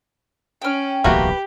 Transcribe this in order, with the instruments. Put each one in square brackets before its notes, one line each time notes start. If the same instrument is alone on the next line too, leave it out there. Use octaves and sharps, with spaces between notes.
[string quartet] C#4 [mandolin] G5 F6
[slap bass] D1 B1 E3 [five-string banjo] A3 A#3 F#4 [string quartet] G4 [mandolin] B4